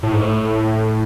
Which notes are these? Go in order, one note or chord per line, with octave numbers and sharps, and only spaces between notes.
A2
G#2
A2